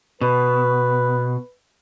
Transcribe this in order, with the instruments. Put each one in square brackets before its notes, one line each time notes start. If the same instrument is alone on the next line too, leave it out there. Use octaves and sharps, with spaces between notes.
[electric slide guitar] B2 [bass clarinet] B4